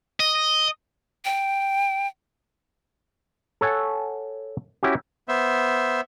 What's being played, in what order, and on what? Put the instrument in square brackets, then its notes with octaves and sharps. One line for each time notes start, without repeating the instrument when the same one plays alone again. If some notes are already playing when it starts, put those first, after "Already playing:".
[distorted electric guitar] D#5
[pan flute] G5
[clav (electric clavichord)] A4 C#5 F#5 G#5
C#4 E4 F#4 G4
[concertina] B3 C5 E5